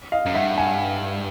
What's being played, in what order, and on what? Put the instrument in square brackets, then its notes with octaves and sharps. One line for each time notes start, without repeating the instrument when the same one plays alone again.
[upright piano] D#5 F5
[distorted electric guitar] F#2
[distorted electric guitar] G2 [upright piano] E5 F#5
[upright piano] F#5 G#5